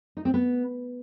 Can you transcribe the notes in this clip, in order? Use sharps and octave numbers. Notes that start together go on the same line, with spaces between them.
D#4
C4
B3